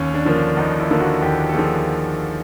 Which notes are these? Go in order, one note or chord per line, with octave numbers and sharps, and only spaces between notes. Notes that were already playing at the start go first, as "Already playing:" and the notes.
Already playing: D#2 C#4
D4
D3 F3 A#3
D4
D#2 D#4
E4
D3 F3 A#3
F#4
D#2 G4
A4
D3 F3 A#3 G#4